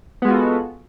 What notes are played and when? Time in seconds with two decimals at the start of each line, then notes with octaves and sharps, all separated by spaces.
0.22 B3
0.25 G#3
0.28 F#4
0.31 F4
0.34 A4